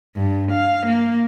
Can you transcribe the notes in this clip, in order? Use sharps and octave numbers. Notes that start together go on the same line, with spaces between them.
G2
F5
A#3